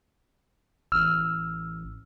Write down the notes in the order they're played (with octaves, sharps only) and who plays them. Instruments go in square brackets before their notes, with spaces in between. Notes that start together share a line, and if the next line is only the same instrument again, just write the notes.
[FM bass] A1 [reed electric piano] E6 F6